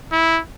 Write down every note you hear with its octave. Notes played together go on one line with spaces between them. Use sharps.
E4